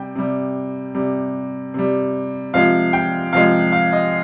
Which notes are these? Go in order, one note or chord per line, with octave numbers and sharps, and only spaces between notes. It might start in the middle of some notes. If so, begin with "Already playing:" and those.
Already playing: C3 G3 G5
C3 G3
C3 G3
C3 G3
C3 F3 G#3 F5
G5
C3 F3 G#3 F5
F5
D#5